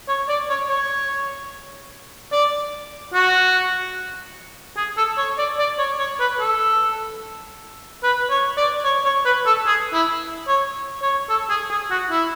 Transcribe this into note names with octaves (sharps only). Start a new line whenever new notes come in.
C#5
D5
C#5
C#5
D5
F#4
G#4
A4
C#5
D5
D5
C#5
C#5
B4
A4
B4
C#5
D5
C#5
C#5
B4
A4
G#4
E4
C#5
C#5
A4
G#4
G#4
F#4
E4